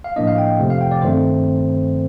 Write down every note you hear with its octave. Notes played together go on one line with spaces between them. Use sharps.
F5
A2 F3 A#3 D4 D#5
F5
G5
F2 C3 F3 A3
F5
G5
D5
G2 D#3 A3 C4 C5